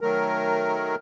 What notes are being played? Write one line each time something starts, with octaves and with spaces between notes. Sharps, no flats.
D#3 F#3 A3 A#4